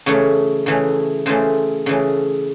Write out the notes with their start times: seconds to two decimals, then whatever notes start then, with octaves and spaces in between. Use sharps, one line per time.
0.06 C#3 E3 A3 C#5
0.66 C#3 E3 A3
1.26 C#3 E3 A3 C5
1.86 C#3 E3 A3